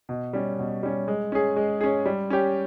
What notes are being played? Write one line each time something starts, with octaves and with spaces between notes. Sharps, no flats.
B2
G3 C#4
B2
G3 C#4
G#3
C#4 G#4
G#3
C#4 G#4
G3
C#4 G4